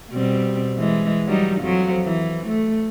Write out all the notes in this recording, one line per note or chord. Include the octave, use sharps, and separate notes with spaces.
B2 G3 C4
E3 G#3
F#3 G3 D#4
F2 F3 F#3
E3
A3